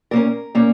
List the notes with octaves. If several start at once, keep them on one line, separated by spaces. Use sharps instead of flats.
A#2 A#3 C#4 A#4
A#2 A#3 C#4